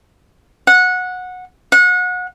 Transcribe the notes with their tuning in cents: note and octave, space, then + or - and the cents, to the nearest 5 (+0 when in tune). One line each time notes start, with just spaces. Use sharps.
F#5 -15
F#5 -30